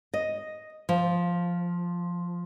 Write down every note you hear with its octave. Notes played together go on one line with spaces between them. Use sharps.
D#5
F3